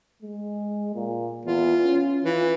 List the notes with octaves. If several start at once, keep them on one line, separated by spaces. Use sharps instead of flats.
G#3
A#2
E2 F4
C#4
E3 F4